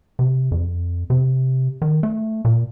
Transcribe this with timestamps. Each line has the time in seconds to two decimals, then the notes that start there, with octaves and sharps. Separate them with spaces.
0.19 C3
0.51 F2
1.10 C3
1.82 D#3
2.03 A3
2.45 A#2